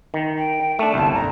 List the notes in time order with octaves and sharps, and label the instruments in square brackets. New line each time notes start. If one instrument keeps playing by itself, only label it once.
[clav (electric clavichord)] D#3
[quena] G5
[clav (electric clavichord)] A3 D4 [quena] A5
[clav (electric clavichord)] G1 C2
[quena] A#5